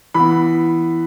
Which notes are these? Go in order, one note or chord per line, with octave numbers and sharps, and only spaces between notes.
E3 B3 B5